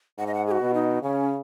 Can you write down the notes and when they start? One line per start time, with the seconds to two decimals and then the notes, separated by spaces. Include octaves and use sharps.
0.18 G#2 F#5
0.27 D#5
0.34 F#5
0.47 G#4
0.51 F#4
0.61 B2
0.74 D#4
1.02 C#3 C#4